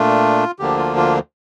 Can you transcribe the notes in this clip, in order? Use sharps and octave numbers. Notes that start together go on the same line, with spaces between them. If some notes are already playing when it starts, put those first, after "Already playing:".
Already playing: A#2 A3 D4 F4
D2 D3 F3 A#3 D4 G4
F4
F4